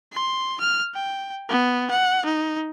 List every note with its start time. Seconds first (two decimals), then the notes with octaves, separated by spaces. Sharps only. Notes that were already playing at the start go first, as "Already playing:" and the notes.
0.12 C6
0.60 F6
0.94 G5
1.49 B3
1.91 F#5
2.25 D#4